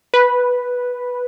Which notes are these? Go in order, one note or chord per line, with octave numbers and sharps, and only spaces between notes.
B4